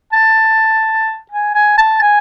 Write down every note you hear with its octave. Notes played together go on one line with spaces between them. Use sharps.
A5
G#5
G#5
A5
G#5